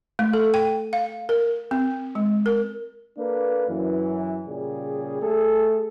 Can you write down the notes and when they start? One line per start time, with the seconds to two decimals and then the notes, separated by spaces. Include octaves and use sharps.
0.19 A3
0.33 A4
0.54 G5
0.93 F5
1.29 A#4
1.71 C4
2.15 G#3
2.46 A#4
3.18 A#3 D4 A4 B4
3.68 F#2 E3
4.48 A#2 C#3 G3 G#4
5.22 A3 G#4 A4